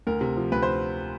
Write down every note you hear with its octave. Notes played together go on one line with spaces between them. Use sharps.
D2 A#4
C3
F3
D2 B4
C5